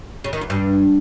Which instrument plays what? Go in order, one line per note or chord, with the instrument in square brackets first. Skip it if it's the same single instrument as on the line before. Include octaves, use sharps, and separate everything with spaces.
[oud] C#3
D#3
E2
G2